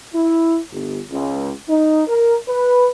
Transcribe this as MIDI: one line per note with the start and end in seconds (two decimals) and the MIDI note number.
0.15 0.59 64
0.72 0.99 31
1.11 1.50 37
1.69 2.02 63
2.07 2.34 70
2.48 2.89 71